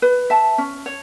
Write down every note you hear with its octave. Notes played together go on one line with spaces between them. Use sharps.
B4
E5 A5
C#4
C#5